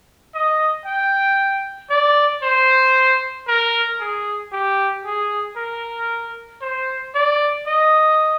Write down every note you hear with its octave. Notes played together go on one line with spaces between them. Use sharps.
D#5
G5
D5
C5
A#4
G#4
G4
G#4
A#4
C5
D5
D#5